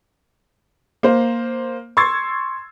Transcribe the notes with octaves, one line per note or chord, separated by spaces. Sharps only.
A#3 C5
C6 C#6 E6 G#6 A6 C7